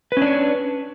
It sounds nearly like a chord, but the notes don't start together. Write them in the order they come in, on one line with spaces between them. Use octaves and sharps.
B4 C#4 D4 C#5